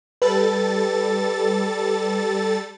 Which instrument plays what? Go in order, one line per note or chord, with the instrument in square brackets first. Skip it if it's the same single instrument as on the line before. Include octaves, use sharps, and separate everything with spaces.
[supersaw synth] G3 A4 A6 [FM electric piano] B4